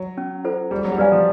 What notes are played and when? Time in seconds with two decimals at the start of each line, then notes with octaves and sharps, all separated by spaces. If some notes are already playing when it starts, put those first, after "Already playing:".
Already playing: F#3
0.18 C#4
0.44 F4 A4 C5
0.71 G3 G#4
0.84 F#3
0.92 G3
0.98 F#3 B4 D5 F5 G#5
1.12 F3